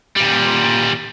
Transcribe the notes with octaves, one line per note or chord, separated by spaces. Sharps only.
A#2 G3